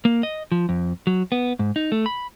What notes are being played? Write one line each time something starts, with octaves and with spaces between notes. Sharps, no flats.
A#3
D#5
F3
F2
F#3
B3
G#2
D#4
A3
B5